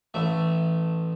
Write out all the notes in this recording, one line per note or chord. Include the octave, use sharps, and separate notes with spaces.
A1 A3